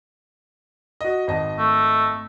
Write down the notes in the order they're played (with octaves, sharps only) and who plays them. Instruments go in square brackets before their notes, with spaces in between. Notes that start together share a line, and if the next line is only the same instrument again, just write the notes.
[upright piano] F#4 D#5
G#1 D#5 A5
[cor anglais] A3